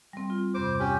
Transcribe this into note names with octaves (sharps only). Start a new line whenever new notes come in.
G3 C4
F4
E2 G2 C3 C5 D6
C#4 G4